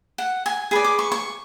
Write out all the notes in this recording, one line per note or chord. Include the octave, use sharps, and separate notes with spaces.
F#5
G#5
G#4 B4 D5
D6
C#6
C#6